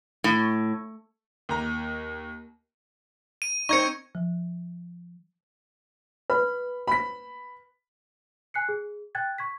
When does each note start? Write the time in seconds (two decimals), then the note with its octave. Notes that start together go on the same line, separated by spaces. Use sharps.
0.24 A2
1.49 D#2 A#5
3.42 D#7
3.69 C4 D#4 C#6 G#6 C#7
4.15 F3
6.30 B4 B5
6.88 B5 B6
8.54 G#5 F#6 C7 C#7
8.69 G#4
9.15 G5 F#6 G#6 A6
9.38 C#6 G#6 B6